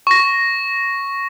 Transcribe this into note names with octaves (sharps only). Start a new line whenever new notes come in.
C#6 A#6